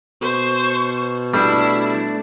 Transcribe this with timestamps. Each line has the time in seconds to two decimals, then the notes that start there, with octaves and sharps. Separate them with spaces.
0.21 B2 C5 C#6
1.34 G3 A3 D4 E4